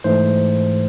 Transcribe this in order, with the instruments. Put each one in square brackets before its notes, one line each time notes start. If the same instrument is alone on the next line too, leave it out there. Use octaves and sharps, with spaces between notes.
[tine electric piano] G#2 E3 A3 C5